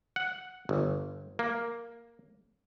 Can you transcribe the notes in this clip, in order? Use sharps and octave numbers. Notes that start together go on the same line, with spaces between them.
F#5
G1
A#3